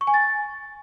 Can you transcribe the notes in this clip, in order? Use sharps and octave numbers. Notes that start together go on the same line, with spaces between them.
C#6
G#5
A6